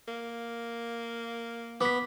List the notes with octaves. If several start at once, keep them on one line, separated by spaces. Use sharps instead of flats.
A#3
B3 D6 B6